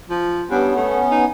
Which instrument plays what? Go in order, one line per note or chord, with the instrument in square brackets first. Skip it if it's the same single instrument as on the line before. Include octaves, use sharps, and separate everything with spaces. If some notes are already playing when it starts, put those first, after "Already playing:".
[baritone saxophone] F3
[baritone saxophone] G2 [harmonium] B3 C#4
[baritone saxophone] A3
D#4